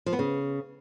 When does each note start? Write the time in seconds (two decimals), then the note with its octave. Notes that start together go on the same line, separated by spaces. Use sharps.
0.06 F3
0.13 B3
0.19 C#3